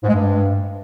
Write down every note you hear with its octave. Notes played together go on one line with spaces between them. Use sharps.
G#2
G#3
G2